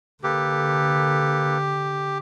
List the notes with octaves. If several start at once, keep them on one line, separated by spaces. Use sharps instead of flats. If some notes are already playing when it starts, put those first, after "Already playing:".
D3 A#3 G4 A4 B4